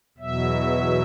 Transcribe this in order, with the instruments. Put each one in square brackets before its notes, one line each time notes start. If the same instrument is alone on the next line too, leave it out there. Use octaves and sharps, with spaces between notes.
[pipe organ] E2 B2 F#3 E5